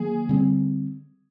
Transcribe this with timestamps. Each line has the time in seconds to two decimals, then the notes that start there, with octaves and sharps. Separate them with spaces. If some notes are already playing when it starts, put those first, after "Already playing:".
Already playing: D#3 F#3 A#3 G#4
0.29 D3 G3 C4